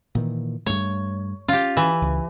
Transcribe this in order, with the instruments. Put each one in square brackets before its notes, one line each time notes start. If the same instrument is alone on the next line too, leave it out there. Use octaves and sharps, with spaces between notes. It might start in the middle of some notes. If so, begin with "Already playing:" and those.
[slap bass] A#2 D#3 E3
[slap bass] G2 A3 [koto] C#5
[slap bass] C#4 [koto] F4 G4
[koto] E3
[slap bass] C#2